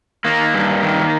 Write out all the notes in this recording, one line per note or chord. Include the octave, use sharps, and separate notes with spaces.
D#3 A#3
G2
D#3